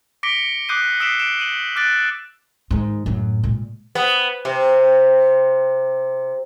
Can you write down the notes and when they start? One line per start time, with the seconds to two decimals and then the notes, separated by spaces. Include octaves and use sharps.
0.23 D6 A#6 B6 C#7 D7 G7
0.69 D6 D#6 F#6 G6 C7 D#7
1.00 D#6 E6 B6 C7 D7 E7
1.19 D7 E7
1.40 D#7 F#7
1.76 D6 F6 F#6 A6 D7
2.71 G#2 D#3
3.06 F#2 A2
3.43 A#2 G#3
3.95 B3
4.45 C3